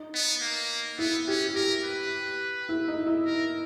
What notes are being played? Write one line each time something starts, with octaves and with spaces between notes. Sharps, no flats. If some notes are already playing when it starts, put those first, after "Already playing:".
Already playing: D#4
B3
A#3
B3 E4
C#4 G4
G4 A#4
B4
E4
D#4
E4
A#4